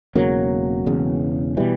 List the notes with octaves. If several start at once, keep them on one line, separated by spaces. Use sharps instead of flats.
E1 E2 C#3 F#3 A#3
E1 E2 C#3
B2 E3 G3